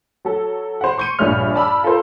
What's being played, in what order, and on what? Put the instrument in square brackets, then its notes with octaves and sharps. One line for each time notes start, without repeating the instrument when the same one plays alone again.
[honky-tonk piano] F#3 A4
C5 F#5
C6 C#6 G6 C#7 D#7
A#1 G2 D4 C#5 E5 F6
D5 A5 B5 E6
F4 A4 A#4 C5